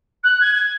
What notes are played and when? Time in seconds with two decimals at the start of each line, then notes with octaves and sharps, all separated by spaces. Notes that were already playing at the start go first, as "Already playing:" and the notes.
0.23 F#6
0.40 G#6
0.55 G#6